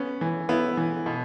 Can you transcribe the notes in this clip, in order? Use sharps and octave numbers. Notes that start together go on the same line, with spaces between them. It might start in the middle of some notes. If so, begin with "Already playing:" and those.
Already playing: B3 C#4
E3
B3 E4
E3
B2